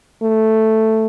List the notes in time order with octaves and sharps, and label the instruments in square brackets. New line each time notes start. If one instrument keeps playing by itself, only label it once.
[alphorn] A3